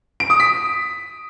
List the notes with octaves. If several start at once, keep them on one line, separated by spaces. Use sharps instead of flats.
D7
D#6
B6